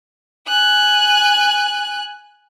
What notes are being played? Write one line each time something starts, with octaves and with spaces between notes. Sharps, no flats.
G#5 F#6